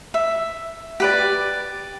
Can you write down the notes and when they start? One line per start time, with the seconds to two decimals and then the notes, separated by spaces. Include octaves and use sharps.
0.14 E5
1.00 G4 B4 D5